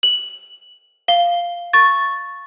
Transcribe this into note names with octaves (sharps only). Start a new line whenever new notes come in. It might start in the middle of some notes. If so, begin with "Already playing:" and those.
F#7
F5 G7
C#6 A6